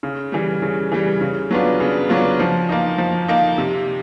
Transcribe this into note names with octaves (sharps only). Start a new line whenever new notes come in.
C#3
E3 G3
C#3
E3 G3
C#3
F#3 B3 D4 F4
C#3
F#3 B3 D4 F4
F3
A#3 D#4
F3
A#3 D#4
C3